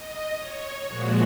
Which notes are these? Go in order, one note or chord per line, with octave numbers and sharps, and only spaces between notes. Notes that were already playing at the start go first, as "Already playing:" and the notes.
Already playing: D#5
C#5
A#2 F3 G#3 F#4